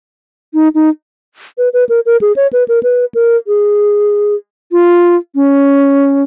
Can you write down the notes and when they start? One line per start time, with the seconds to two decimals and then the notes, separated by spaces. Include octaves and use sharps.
0.54 D#4
0.75 D#4
1.58 B4
1.73 B4
1.89 A#4
2.06 A#4
2.21 G#4
2.36 C#5
2.53 B4
2.68 A#4
2.83 B4
3.15 A#4
3.47 G#4
4.72 F4
5.35 C#4